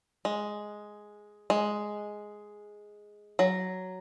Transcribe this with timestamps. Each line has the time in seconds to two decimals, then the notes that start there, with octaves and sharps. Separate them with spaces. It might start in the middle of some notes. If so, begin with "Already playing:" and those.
0.25 G#3
1.50 G#3
3.39 F#3